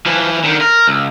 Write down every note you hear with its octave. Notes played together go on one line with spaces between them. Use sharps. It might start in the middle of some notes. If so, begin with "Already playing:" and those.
E3 F3
D3 D#3
A#4
C#2